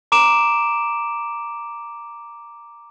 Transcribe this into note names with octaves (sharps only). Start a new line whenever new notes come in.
A#5 D6 D7 E7